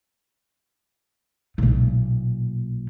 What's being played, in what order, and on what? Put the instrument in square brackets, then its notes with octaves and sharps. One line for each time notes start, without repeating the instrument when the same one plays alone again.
[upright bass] B1 A#2